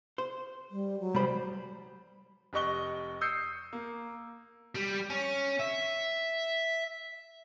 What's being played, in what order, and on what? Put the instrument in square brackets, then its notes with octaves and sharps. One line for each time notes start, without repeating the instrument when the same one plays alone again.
[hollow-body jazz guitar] C5
[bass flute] G3
F#3
[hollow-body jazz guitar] C2 B5 [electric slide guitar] G3 C5
[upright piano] F1 G4 D#5 C#6 F#6 G7
D#6 E6 G6 C7 C#7
A#3
[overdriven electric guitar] G3
C#4
E5